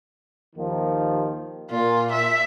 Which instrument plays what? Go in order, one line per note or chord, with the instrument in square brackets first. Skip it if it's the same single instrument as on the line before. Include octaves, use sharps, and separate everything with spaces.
[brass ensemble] D#2 D#3 F3
[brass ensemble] A#2 [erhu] F4
[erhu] E5